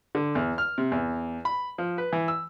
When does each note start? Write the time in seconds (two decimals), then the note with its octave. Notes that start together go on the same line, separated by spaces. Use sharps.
0.15 D3
0.35 E2
0.58 F6
0.78 C3
0.92 E2
1.45 B5
1.78 F3
1.98 B4
2.13 E3
2.28 E6